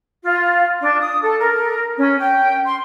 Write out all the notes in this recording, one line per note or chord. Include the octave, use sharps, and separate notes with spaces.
F4
D4
D#6
A4
A#4
C#4
G5
C6